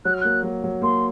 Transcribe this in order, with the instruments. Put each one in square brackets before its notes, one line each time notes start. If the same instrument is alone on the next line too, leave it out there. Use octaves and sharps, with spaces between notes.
[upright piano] F#3 [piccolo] F#6
[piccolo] F6
[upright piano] A#3 [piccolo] F#6
[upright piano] F#3
F#3
[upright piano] A#3 [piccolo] C6